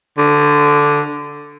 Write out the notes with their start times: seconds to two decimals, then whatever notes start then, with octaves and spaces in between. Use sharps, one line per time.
0.18 D3